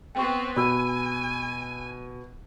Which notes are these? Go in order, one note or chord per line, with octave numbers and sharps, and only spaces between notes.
B3 C4 G5 C#6
B2 G#5 B5 E6